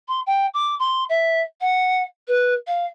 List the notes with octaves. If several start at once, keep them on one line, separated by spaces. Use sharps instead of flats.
C6
G5
D6
C6
E5
F#5
B4
F5